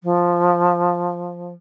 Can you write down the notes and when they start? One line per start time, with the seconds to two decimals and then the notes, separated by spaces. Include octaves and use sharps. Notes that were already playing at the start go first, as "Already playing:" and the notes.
0.03 F3